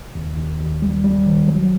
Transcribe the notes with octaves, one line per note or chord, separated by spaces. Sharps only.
D#2
D#2
D#2
G3
G3
D#3
F#3